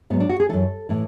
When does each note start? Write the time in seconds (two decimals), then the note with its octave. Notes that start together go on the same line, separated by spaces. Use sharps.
0.10 G#2 B3
0.13 F#3
0.20 D4
0.29 F#4
0.40 G#4
0.49 F#2 E3 A4
0.89 A2 E3